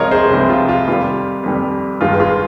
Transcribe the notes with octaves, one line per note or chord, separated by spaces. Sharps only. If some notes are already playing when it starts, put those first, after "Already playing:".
Already playing: C2 C3 F3 G#3 F4 A#4 C#5 D#5
G#4 C5
C2 C3 F3 G#3
F4
F4
F2 D#3 G3 F4
F2 D#3 G3
G1 G2 D#3 G#3 F4
F4 G#4